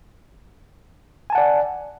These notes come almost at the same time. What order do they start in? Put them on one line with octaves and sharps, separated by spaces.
G#5 A5 F#5 D5